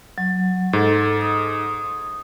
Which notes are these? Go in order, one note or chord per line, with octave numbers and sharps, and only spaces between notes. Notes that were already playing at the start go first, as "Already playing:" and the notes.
F#3
G#2 A4
D#6